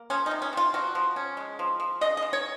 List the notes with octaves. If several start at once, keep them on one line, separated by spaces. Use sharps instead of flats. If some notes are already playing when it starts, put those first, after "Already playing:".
Already playing: A#3
F3 C#4
D#4
C3
C#4
C3 F4
F3 F#4
F3
C#4
G#3
F3
F3
C#3 D#5
D#5
C#3
C#5